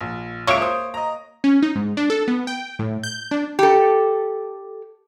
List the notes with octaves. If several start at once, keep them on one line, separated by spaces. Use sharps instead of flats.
A#1
C#2 A#3 C#5 E5 D7
C5 D#6
D#5 A#5
C#4
D#4
G#2
D4
A4
B3
G5
A2
G6
D4
G4 A4